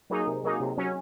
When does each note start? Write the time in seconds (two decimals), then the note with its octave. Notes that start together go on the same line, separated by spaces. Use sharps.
0.10 F#3 A#3 D#4 G#4
0.27 C3
0.44 F#3 A#3 D#4 G#4
0.60 C3
0.77 F#3 C#4